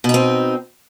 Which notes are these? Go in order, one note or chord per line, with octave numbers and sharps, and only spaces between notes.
B2 C4 D#4